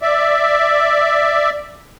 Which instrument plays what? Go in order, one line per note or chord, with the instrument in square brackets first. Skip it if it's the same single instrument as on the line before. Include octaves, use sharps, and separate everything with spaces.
[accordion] D5 E5